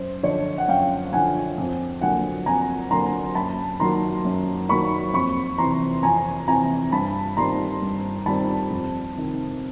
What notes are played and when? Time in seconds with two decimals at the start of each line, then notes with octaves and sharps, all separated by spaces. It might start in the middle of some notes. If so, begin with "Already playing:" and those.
Already playing: F#2 C5
0.23 D3 F3 C#5 D#5
0.58 F#5
0.68 F#2 F5 G5
1.12 D3 F3 F#5 G#5
1.57 F2
2.01 D3 F#3 A#3 F#5 G#5
2.46 F2 G#5 A#5
2.91 D3 F#3 A#3 A#5 C6
3.35 F#2 A5 B5
3.80 D#3 F#3 A#3 A#5 C6
4.25 F#2
4.69 D#3 F#3 A#3 B5 C#6
5.13 F2 B5 C#6
5.58 C3 E3 A#5 C6
6.03 F2 G#5 A#5
6.48 C3 E3 G#5 A#5
6.92 G2 A5 B5
7.37 D#3 G3 C4 A#5 C6
7.82 G2
8.26 D#3 G3 C4 A5 B5
8.70 F2
9.15 C3 D#3